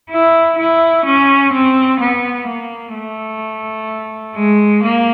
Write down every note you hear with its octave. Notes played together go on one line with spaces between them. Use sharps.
E4
E4
C#4
C4
B3
A#3
A3
G#3
A#3